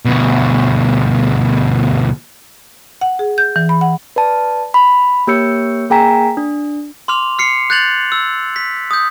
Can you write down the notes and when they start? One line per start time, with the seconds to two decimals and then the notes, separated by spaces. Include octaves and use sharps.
0.05 D2 B2
3.01 F#5
3.19 G#4
3.38 G6
3.56 E3
3.69 B5
3.81 F#5
4.16 B4 D5 A5
4.74 B5
5.27 A#3 G4 C#5 E6 G6 C#7
5.90 A#3 G#4 G5 G#5 A#5 B6
6.37 D4
7.08 C6 D6 F6 F7
7.39 F6 C7 C#7
7.70 F#6 G6 A6 F7 F#7
8.12 E6
8.56 B6
8.91 D#6 G6